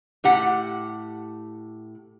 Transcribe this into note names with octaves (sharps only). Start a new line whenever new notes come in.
A2 G4 F#5